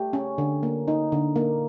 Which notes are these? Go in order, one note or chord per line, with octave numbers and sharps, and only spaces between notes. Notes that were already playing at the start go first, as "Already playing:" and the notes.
Already playing: A3 G4
C#4
D3
A#3
D#4
D3
A#3